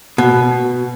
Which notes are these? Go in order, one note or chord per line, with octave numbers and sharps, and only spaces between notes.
B2